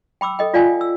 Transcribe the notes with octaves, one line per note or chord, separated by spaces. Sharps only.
G5 B5 D6 E6
A4 D#5 G5
F4 D5 F5 G5 G#5
E6